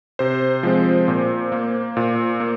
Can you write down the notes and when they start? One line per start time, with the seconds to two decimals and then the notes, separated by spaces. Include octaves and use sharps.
0.19 C3 C5
0.63 F3 G#3 C4
1.08 A#2
1.52 A#3
1.97 A#2
2.40 A#3